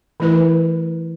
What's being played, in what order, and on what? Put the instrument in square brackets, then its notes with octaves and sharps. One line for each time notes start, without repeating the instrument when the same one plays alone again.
[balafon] E3 A3 E4 B4